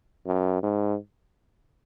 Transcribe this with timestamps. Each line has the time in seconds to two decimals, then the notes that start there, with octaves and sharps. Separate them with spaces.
0.26 F#2
0.63 G#2